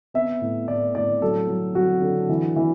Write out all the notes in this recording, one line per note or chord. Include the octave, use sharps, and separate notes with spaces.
B3 E5
A2
A2 D5
A2 D5
F#3 A4
F#3
F#3 F#4
D3
E3
E3